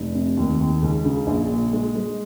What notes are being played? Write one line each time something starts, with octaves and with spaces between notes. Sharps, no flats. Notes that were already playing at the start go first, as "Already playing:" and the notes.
Already playing: F1
C3
D#2
D#2
C#2
C#3
A#1
A#2
G#3
G#3